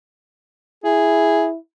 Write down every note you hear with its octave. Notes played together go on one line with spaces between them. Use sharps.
E4 G#4